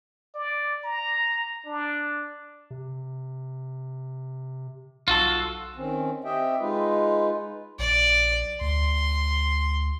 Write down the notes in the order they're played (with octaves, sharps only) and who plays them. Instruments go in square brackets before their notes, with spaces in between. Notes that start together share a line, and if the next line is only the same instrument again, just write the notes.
[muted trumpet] D5
A#5
D4
[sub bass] C3
[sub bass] B1 [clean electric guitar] F4 F#4 A4
[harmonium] D#3 C4 C#4
C4 G4 D#5 E5 G5
G#3 D#4 F4 B4
[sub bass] A#1 [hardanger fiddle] D5
[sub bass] D2 [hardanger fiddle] C6